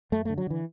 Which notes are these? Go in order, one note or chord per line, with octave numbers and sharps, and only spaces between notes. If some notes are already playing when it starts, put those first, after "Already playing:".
F#2 A3
D3 A3
F#3
D3 E3